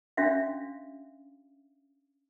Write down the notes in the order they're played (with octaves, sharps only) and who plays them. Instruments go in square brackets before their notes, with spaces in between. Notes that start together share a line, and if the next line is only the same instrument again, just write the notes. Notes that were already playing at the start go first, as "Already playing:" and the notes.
[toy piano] C#4 D4 F#4 E5 F5